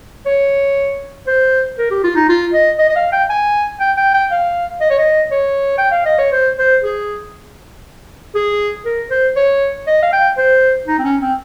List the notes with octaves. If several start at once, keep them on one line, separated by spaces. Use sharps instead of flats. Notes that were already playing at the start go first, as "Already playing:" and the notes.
C#5
C5
A#4
G4
F4
D#4
F4
D#5
D#5
D#5
F5
G5
G#5
G5
G5
G5
F5
D#5
C#5
D#5
C#5
G5
F5
D#5
C#5
C5
C5
G#4
G#4
A#4
C5
C#5
D#5
F5
G5
C5
D#4
C4
C#4
C4